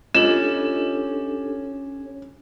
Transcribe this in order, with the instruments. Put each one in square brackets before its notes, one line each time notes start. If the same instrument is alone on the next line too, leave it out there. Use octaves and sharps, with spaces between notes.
[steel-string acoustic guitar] C#4 [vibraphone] D4 G4 A4 [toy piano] F4 D#5 [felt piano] E7